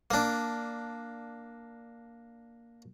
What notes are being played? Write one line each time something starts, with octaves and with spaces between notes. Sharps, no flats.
A#3 D4